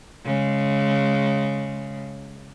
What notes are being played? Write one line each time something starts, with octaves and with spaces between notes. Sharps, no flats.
C#3 G#3